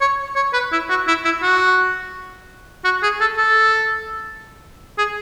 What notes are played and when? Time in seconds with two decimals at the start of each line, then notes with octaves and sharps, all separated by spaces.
0.01 C#5
0.36 C#5
0.53 B4
0.72 E4
0.89 F#4
1.08 E4
1.25 E4
1.42 F#4
2.85 F#4
3.03 G#4
3.20 A4
3.37 A4
4.98 G#4